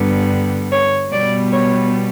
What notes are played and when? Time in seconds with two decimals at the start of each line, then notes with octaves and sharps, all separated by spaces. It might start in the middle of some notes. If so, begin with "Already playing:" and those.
Already playing: G2 D3 G3 B3
0.71 C#5
1.11 B2 G3 B3 D5
1.51 C#5